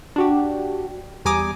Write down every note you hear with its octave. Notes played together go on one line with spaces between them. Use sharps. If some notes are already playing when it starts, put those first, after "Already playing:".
D4 F#4 G4
E2 G3 G#5 A#5 D6 D#6